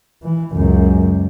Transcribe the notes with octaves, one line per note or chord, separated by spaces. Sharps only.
E3
C#2 F#2